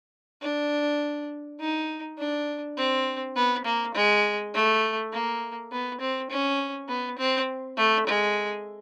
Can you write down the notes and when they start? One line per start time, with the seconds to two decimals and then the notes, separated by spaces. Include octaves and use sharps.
0.41 D4
1.60 D#4
2.18 D4
2.77 C4
3.36 B3
3.65 A#3
3.94 G#3
4.54 A3
5.12 A#3
5.72 B3
6.00 C4
6.30 C#4
6.88 B3
7.18 C4
7.77 A3
8.07 G#3